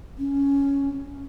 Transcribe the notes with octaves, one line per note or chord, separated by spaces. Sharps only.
C#4